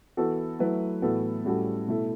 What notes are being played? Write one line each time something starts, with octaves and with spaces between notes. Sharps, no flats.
E3 B3 F#4 A4
F#3 A3 E4 B4
A2 E3 B3 F#4 A4
A2 G3 C#4 F#4 A4
B2 A3 E4 A4